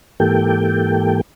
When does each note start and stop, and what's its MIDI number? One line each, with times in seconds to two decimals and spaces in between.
0.20 1.21 44
0.20 1.21 52
0.20 1.21 58
0.20 1.21 67
0.20 1.21 69
0.20 1.21 79